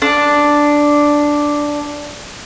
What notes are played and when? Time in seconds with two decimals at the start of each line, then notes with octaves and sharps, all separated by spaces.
0.02 D4 D5